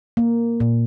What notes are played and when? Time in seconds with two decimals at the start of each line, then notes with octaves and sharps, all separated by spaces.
0.17 A#3
0.60 A#2